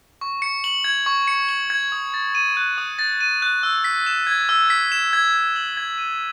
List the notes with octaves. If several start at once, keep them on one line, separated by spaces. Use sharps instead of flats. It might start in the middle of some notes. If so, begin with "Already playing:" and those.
C#6
C#7
F#7
G#6
C#6
C#7
F#7
G#6
D#6
A6
D#7
F#6
D#6
A6
D#7
F#6
E6
B6
E7
G#6
E6
B6
E7
G#6
G#6
F#7
G#6
D#7